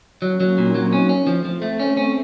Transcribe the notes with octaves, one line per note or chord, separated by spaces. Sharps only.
F#3 A#3 C#4
F#3
A#2 C4 D#4
F#3
C#4
C#4
F3 A3 C4
F3
A3
C#4
C#4